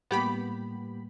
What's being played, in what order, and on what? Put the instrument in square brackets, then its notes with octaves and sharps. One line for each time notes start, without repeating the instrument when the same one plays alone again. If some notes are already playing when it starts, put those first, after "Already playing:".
[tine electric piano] A2 G3 A#3 [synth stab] B3 G4 B5